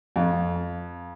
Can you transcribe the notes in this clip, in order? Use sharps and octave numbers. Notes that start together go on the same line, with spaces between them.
F2